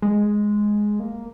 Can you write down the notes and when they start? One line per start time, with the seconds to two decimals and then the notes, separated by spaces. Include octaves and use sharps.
0.02 G#3
1.00 A#3